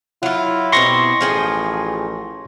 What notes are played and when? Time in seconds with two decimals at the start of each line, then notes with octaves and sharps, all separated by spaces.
0.23 F#3 E4 F4
0.72 B2 C4 G4 C6 C#6 A#6
1.21 A1 F3 G#4 G5